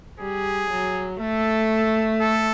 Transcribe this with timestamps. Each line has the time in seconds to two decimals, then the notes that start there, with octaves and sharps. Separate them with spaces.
0.19 G3 G#4
0.70 F#3
1.20 A3 A4
2.21 A4